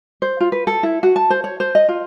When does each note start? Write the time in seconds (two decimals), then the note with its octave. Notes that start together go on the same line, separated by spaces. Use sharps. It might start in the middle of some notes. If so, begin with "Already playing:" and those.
0.22 C5
0.40 F4
0.52 B4
0.67 A4
0.83 E4
1.03 F#4
1.16 A5
1.30 C5
1.44 C#5
1.60 C5
1.75 D#5
1.89 F4